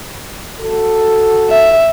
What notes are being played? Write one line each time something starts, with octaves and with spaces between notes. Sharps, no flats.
F#4 A4
E5